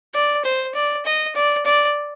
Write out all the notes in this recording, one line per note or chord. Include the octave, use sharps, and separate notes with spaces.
D5
C5
D5
D#5
D5
D5